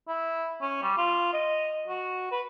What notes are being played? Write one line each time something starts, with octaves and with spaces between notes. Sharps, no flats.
E4
C#4
G3
F4
D#5
F#4
B4